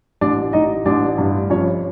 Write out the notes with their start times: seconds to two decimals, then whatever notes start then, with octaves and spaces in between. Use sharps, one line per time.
0.21 A1 D4 D5
0.53 A1 D#4 D#5
0.86 A1 D4 D5
1.18 G2
1.50 F2 C#4 C#5